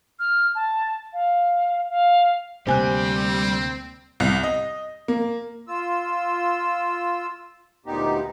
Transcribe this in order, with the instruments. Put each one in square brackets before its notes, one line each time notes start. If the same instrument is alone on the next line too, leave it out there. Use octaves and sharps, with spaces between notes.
[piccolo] F6
A5
F5
F5
[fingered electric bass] D2 C3 A#3 [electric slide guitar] G3 [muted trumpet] C4 [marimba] C5 G#5 F#6
[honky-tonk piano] C2
D#5
A#3
[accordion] F4 E6
D2 A#2 B3 D#4 G4